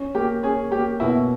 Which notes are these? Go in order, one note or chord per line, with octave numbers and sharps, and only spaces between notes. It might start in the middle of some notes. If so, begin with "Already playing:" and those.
Already playing: C#4
A#3 G4
C#4 G#4
A#3 G4
B2 E4